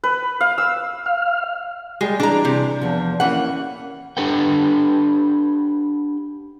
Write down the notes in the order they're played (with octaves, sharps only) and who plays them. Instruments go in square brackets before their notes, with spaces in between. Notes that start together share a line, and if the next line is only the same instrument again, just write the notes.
[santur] B4
F5
E6
[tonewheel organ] F5
[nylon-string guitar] G3 G4 G#4 [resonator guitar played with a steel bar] G#3
[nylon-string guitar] E3 G3 G#4 [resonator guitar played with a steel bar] D4 A#5
[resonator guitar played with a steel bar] C3
[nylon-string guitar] E2 F3
[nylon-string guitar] D#2 C#4 [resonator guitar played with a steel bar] E3 F#5
[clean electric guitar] D4 G4 A4 B4 F#5 G5